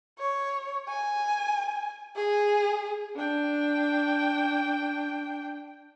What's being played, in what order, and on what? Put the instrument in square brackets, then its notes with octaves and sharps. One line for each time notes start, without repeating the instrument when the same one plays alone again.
[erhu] C#5
G#5
G#4
[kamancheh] D4 G5